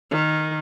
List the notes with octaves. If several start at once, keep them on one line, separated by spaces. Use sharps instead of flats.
D#3